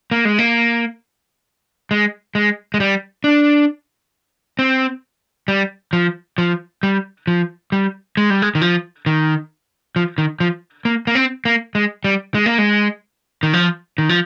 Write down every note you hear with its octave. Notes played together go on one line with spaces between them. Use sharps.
A#3
G#3
A#3
G#3
G#3
G#3
G3
D4
C4
G3
F3
F3
G3
F3
G3
G#3
G3
G#3
D#3
F3
D#3
F3
D#3
F3
A#3
A#3
C4
A#3
G#3
G3
G#3
A#3
G#3
D#3
F3
D#3
F3